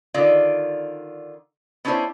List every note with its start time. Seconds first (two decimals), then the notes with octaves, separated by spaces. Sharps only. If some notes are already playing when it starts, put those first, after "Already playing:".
0.14 D3 D#3 F4 D5
1.85 B3 C#4 D4 E4 C5 C#5